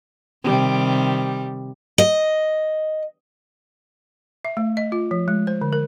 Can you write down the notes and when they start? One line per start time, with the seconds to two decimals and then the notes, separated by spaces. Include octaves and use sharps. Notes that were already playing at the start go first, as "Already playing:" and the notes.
0.43 C3 D#3 G3
1.98 D#5
4.45 E5
4.57 A3
4.77 D#5
4.92 F4
5.11 F3
5.28 G#3
5.47 C5
5.61 D3
5.73 A#4